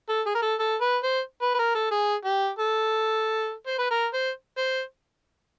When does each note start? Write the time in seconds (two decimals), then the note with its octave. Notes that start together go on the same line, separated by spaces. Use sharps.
0.09 A4
0.26 G#4
0.35 A#4
0.42 A4
0.60 A4
0.81 B4
1.04 C5
1.42 B4
1.55 B4
1.59 A#4
1.75 A4
1.91 G#4
2.25 G4
2.59 A4
3.67 C5
3.79 B4
3.91 A#4
4.14 C5
4.58 C5